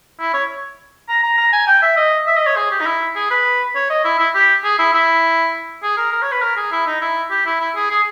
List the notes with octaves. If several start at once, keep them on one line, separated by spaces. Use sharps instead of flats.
E4
C#5
A#5
A#5
A#5
G#5
G5
E5
D#5
E5
D#5
C#5
G#4
G4
D#4
E4
G#4
B4
C#5
D#5
E4
E4
G4
G#4
E4
E4
G#4
A#4
A#4
C#5
B4
A#4
G#4
E4
D#4
E4
G4
E4
E4
G#4
G#4